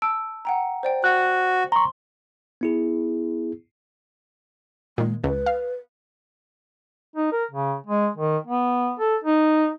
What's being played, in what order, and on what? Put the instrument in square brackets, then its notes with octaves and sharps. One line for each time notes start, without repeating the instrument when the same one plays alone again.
[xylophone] A5 E6 D7
F#5 G5 A#5
C5 D5 G5
[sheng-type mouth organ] F#4 [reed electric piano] F#6
[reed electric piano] A#5 C#6 [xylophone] C6
[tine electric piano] B3 E4 G#4
[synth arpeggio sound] A#2 D#3 [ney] G#3
[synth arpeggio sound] C#2 [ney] B4
[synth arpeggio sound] F5
[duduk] D#4
A#4
C#3
G#3
D#3
B3
A4
D#4